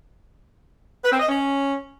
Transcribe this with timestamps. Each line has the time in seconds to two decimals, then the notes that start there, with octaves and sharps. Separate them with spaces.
1.03 B4
1.11 C4
1.19 D#5
1.28 C#4